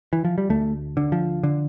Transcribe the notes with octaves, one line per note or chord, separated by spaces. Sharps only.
E3
F3
G3
D2 A3
D3
F3
D3